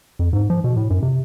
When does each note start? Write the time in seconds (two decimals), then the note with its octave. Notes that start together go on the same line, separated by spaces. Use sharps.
0.19 F2
0.33 G#2
0.50 F3
0.64 B2
0.76 A2
0.90 F#2
1.02 C3